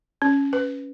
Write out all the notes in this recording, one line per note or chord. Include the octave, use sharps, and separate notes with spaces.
C#4
B4